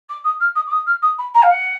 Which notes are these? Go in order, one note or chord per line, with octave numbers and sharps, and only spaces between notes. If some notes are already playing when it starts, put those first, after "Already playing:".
D6
D#6
F6
D#6
D6
D#6
F6
D#6
B5
A#5
F5
F#5